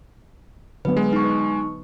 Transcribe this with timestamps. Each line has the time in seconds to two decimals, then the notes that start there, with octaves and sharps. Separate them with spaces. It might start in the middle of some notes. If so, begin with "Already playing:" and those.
0.85 D3 F#3 B3 B4
0.97 G#3
1.13 D#4 C#6
1.24 B4